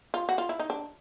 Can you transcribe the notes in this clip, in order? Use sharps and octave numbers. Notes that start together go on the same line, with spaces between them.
F4
F#4
F4
E4
D#4
D4